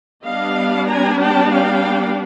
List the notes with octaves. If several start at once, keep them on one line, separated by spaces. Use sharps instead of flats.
G3 B3 D4 D#5 F5
G#5 A#5
G5 A5
F5 G5